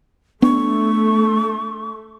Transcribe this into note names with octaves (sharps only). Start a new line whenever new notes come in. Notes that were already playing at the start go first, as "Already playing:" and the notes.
A3 B3 D4 C#6